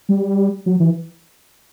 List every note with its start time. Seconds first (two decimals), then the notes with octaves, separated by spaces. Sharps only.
0.09 G3
0.66 F#3
0.80 E3